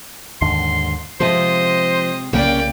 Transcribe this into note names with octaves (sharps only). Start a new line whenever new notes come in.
D#2 G#2 D3 C6
C3 F3 G#3 C5 D#5
C2 C#3 A#3 C#4 D5 G5